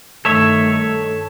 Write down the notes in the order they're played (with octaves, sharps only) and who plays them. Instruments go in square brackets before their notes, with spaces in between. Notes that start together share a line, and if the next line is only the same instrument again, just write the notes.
[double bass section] G2 D#3 A3 [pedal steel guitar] A4 C#5 E5